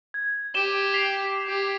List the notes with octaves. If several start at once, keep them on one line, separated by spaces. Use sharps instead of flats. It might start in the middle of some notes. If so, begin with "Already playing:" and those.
G#6
G4 D#7 E7 G7
B6 C7 F7
G4